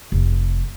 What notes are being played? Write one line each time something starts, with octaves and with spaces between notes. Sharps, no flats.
F1